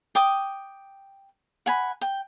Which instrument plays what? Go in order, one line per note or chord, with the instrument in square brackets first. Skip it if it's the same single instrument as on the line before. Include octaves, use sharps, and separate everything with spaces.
[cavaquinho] G5 D6 D#6
F#5 G#5 B5
G5